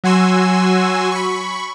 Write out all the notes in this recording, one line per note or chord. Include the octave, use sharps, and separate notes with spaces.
F#3 F#4 G#5 C6 E6
B5 C#6